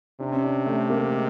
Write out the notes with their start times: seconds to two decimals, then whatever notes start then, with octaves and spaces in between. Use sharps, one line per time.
0.20 C3 D4
0.32 C#4
0.44 D4
0.66 A3
0.90 A#3
1.01 A3
1.12 G#3